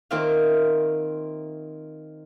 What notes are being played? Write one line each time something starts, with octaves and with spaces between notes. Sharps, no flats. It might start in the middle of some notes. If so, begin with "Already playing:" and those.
D#3 A#3 C4 F4 E5 F5